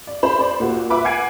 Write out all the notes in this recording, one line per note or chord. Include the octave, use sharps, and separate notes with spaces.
D5
C5 B5
C5 D5
A#2 A#3 F#4
F4 B4 E5 D6
F#5 G#5 G#6 C7 D7